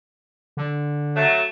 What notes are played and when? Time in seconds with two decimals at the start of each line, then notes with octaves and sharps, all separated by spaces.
0.57 D3
1.16 F#3 A3